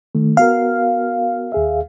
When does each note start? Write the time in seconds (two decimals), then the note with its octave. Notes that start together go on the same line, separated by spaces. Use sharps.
0.15 D#3 A3
0.37 B3 F#4 A#4 F5
1.52 D#2 G#4 E5